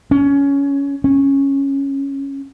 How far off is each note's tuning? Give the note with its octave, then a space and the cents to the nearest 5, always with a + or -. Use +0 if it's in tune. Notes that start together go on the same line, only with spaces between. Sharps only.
C#4 +15
C#4 -5